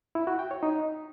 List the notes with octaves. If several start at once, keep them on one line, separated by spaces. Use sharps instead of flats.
E4
F#4
G5
C#5
D#4